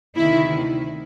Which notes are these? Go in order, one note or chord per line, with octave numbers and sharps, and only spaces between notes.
D2 C3 D#3 E4